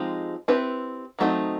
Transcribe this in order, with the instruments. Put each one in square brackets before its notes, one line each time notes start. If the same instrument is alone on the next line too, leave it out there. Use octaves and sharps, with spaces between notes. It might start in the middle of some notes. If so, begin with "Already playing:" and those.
Already playing: [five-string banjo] F3 G#3 C4 D#4 G4
C4 E4 G4 B4
D#3 F#3 A3 C4 D#4